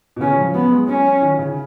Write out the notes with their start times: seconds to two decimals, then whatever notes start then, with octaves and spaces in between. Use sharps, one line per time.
0.16 B2
0.20 C#3 C#4
0.38 F3
0.54 F#3 B3
0.72 G#3
0.87 F#3 C#4
1.22 D#3
1.39 C#3